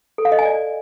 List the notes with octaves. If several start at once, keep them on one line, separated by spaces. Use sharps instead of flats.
A4
F5
D#5
G#5
D5